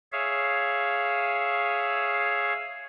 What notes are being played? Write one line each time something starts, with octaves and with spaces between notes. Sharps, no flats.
G#4 C#5 E5 F5